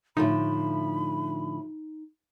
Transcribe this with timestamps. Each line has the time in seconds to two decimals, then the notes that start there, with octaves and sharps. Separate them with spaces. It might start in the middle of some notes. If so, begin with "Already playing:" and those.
0.17 A2 D3 F3 D#4 B5